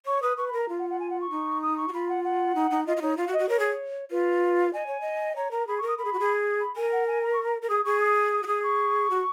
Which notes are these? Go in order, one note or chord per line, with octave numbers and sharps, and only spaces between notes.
C#5 C#6
B4 D#6
B4 C#6
B5
A#4 A#5
F4
F#5
F#5
G#5
F#5
C#6
D#4
D#6
C#6
F#4
F4 B5
F#5
F#5
D#4
D#4
F4 D#5
F4
D#4 C#5
F4 F5
F#4
D#5
F#4
A#4 C#5
G#4
F4 B4
D#5 G#5
C#5
D#5
C#5 A#5
A#4 A#5
G#4 B5
C#6
A#4
D#6
A#4 B5
G#4
F#4
G#4
B5
A#4 G#5
F#5
G#5
A#5
C#6
A#5
A#4
G#4 D#6
G#4 C#6
D#6
F#4
G#4 D#6
C#6
F#4